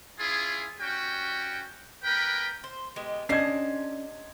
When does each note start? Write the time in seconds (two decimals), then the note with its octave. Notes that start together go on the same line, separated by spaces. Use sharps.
0.19 C#4 E4 F4 G#4
0.79 G3 C#4 F#4 G5
2.03 B3 A#4 B4 G5 B5
2.64 C5
2.96 B2 G#3 G4
3.29 C3 C#4 D4 D#5 A5 G#6 C7